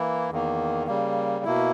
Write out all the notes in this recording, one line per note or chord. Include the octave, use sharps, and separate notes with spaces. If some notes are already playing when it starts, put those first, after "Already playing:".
Already playing: E3 A#3 E4
E2 D#3 A#3
C#3 G3 A#3
B2 A#3 E4